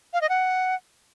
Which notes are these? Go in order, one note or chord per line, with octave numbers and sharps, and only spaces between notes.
F5
D#5
F#5